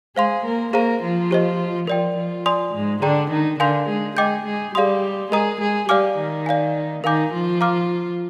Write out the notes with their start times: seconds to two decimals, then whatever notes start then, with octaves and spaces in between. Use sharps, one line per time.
0.16 G#3 G#4 C5 F5 C6
0.44 A#3 A#4
0.73 A#3 G#4 A#4 C5 F5 A#5
1.02 F3 F4
1.31 G4 C5 D#5
1.87 F3 F4 A#4 D5 G5
2.17 F3 F4
2.46 D5 G#5 C6 D#6
2.73 G#2 G#3
3.02 D3 D4 G#4 D5 G5 A#5
3.31 D#3 D#4
3.60 D3 D4 A#4 F5 G#5 C6 G6
3.88 G#3 G#4
4.17 G#3 G#4 D#5 G5 D6 G6
4.45 G#3 G#4
4.75 G3 G4 G#4 D5 F5 C6 D#6
5.32 G#3 G#4 A#4 D#5 A#5 D#6
5.60 G#3 G#4
5.89 G3 G4 D5 F5 G#5 D6 F6
6.18 D#3 D#4
6.46 D5 F5 G#5
7.04 D#3 D#4 A#4 F5 G#5 D6 G6
7.33 F3 F4
7.61 F5 A#5 D6 F6